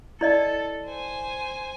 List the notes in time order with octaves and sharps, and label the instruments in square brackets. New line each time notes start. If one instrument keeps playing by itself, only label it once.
[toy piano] E4 D5 D#5 [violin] A4
[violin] C5 G#5